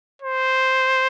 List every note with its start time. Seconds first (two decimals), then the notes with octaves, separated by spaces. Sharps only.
0.22 C5